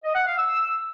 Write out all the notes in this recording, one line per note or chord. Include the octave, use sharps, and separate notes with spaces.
D#5
F#5
F5
E6